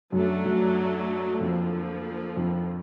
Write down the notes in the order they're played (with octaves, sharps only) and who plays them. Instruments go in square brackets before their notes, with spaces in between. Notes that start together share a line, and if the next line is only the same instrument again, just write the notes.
[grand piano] F#2 [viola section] F#3 A3 D4
[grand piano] F#2
[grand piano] F2 [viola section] D3 F3 A#3
[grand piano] F2